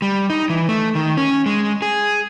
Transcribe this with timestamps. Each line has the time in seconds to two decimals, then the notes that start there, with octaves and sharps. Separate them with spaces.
0.02 G3
0.30 D#4
0.50 E3
0.69 A3
0.95 D#3
1.18 C#4
1.46 G#3
1.82 G#4